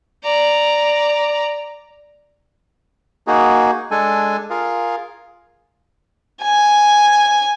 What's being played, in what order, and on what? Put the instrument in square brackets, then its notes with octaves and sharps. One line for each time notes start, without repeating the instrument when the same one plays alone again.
[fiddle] D5 A#5
[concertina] A#3 D#4 F#4 G#4
G#3 D4 A4 G#5
F4 G#4 A#4 F5
[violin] G#5